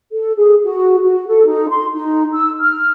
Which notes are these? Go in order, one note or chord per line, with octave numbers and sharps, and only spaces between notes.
A4
G#4
F#4
F#4
A4
D#4
C6
D#4
E6
F6